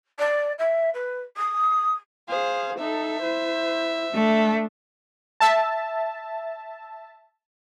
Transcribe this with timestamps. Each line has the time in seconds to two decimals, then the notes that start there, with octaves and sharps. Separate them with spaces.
0.19 D5
0.58 E5
0.94 B4
1.36 D#6
2.29 G#4 C5 F5
2.79 D#4 A4 E5
3.22 E4 C5
4.13 A3 D4
5.40 E5 A5